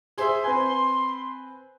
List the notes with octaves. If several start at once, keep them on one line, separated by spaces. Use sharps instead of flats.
G#4 C5 E5 C6
C4 B4 G#5